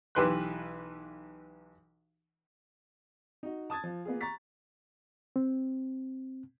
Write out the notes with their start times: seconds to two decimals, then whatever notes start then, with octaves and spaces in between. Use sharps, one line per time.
0.15 B1 E3 G4 B4 C6 F#6
3.43 D#4 F#4
3.70 A5 D#6 G#6 A6
3.84 F3
4.05 A#3 B3 F4 G#4
4.21 A#5 C#6 A6 B6
5.36 C4